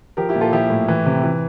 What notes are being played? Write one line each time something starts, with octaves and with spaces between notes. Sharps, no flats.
F3 G4 A#4
E4 G4
A#2
F4 A4
F3 E4 G4
A2
E3
C3
E3